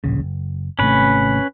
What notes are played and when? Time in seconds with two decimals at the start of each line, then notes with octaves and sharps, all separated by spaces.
0.04 D1 A#1 C#3
0.22 F#1
0.79 G#1 C3 A3 C#4 B4